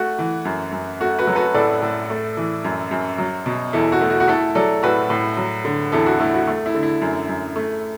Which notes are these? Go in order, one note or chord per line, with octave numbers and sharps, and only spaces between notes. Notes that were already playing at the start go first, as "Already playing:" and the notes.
Already playing: A3 F#4
E3
F#2
F#2
A3 F#4
F#4 B4
F#3 A4
F#4 B4
A2 A4 D5
A2
A3
E3
F#2
F#2
F#3
B2
E2 E4 A4
F#4
A3
F#4
F#4
A3 E4 A4
F#3 A4 D5
A2 F#4 B4
A2
F#3
D3
E2 E4 A4
F#4
A3 E4
F#4
A3
E4
D3
E4
F#2
F#2
A3